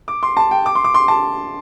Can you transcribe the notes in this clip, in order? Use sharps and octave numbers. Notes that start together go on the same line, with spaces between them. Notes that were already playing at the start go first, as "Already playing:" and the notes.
D6
C6
A5
G5
D6
C6
D6
C6
A5